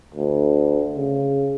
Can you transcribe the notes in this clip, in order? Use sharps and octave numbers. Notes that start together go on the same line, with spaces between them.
D2
C#3